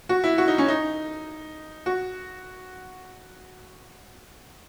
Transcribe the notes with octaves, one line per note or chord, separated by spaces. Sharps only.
F#4
E4
F#4
D#4
C#4
D#4
F#4